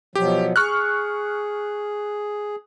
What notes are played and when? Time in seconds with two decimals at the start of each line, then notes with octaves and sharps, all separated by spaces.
0.15 B2 F3 F#3 G4
0.56 G#4 C#6 F6 F#6